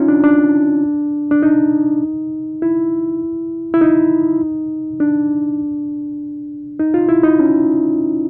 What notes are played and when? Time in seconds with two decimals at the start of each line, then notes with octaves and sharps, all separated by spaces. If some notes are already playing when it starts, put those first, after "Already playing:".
Already playing: C#4 D#4 F4
0.08 D4
0.23 D4
1.31 D4
1.42 D#4
2.62 E4
3.74 E4
3.81 D#4
5.00 D4
6.79 D#4
6.94 F4
7.09 E4
7.24 D#4
7.39 C#4